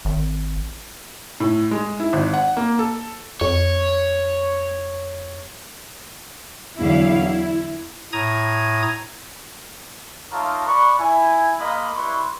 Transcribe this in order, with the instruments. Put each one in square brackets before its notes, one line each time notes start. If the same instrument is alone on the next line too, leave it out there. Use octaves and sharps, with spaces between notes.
[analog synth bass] G#1
[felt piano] A2
G#3
E4
G#1
F#5
A#3
A4
[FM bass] F2 [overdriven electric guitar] C#5
[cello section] E2 D3 F#3 E4 F5
E4
[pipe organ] A2 A#5 D#6 G#6
[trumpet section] A3 D#4 F4 A#4 C#5 A5
B4 D5 B5 C#6
E4 G#5
G#3 A#3 D#5 F5 B5
G3 E4 B4 C6 C#6